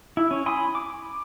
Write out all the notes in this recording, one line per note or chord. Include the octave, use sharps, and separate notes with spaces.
E4
C#4
G#5 B5 C6 D#6
D6